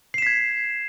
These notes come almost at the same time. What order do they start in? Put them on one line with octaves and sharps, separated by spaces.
C7 E7 B6 G#6